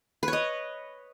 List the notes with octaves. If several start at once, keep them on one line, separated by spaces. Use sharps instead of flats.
B4
C#5
D#5